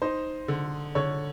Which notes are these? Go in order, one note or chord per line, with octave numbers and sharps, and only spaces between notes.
D#4 C5
D3
D3 C#5